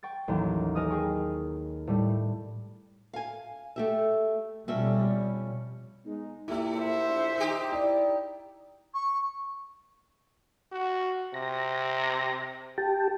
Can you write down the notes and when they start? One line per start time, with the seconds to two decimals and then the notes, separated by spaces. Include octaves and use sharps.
0.03 G5 C#6 A6
0.28 A1 D#2 F#3
0.75 A4 A#4 D#5 G#5 D#6
0.90 G#4 G5 C#6
1.87 A2 G3 A3
3.13 F5 G#5
3.76 A3 G4 E5
4.68 F2 B2 G3 C#4 E5
6.04 G#3 B3 D#4
6.48 A#2 A3 A#3 E4 G4 E6
6.78 C5 E5
7.08 A#1
7.38 D#3 D#4 G4
7.72 E4 D5
8.94 C#6
10.72 F#4
11.34 C3 A#6
12.78 G4 G5 A5